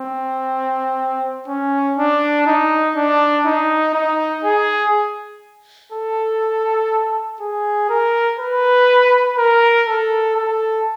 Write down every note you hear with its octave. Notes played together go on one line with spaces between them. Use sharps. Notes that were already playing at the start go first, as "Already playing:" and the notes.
Already playing: C4
C#4
D4
D#4
D4
D#4
D#4
G#4
A4
G#4
A#4
B4
A#4
A4
A4